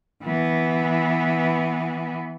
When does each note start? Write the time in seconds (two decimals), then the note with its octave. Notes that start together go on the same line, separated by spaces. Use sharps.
0.24 E3 B3